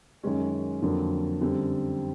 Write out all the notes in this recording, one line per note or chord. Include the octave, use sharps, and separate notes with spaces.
F#2 D#3 G#3 C#4
F2 D3 F#3 A#3
F#2 D3 G3 C4